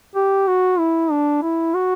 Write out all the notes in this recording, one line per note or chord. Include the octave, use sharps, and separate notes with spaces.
G4
F#4
E4
D4
E4
F#4